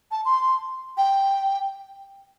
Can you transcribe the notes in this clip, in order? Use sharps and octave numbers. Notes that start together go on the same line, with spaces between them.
A5
C6
G5